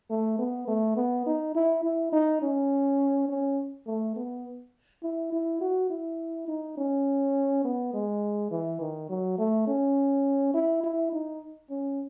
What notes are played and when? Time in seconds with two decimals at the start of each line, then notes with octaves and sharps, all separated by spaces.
0.10 A3
0.39 B3
0.67 A3
0.96 B3
1.26 D#4
1.55 E4
1.84 E4
2.13 D#4
2.42 C#4
3.29 C#4
3.87 A3
4.16 B3
5.03 E4
5.32 E4
5.61 F#4
5.90 E4
6.48 D#4
6.77 C#4
7.65 B3
7.93 G#3
8.51 E3
8.81 D#3
9.09 F#3
9.38 A3
9.67 C#4
10.54 E4
10.83 E4
11.12 D#4
11.70 C#4